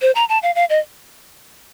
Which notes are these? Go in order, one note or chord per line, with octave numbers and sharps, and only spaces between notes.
C5
A#5
A5
F5
F5
D#5